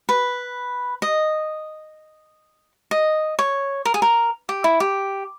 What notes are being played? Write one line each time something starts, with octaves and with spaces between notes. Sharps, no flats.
B4
D#5
D#5
C#5
A#4
G#4
A#4
G4
E4
G4